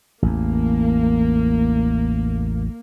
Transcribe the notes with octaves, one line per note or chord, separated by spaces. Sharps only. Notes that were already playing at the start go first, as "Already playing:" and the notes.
A1 E2 A#3